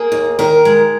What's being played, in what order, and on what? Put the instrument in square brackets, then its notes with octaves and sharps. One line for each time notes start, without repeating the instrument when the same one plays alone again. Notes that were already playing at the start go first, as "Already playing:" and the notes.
Already playing: [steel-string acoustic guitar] A#3 G#4
D#2
D#3 A#4
G#3